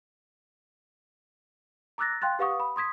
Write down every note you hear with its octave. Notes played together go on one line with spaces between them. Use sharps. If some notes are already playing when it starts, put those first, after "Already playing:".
A#5 D6 E6 F#6 A6 A#6
F5 G5 C6 F#6 A6
G4 B4 F5 F#5 C#6 D#6
B5
C6 D#6 G#6 B6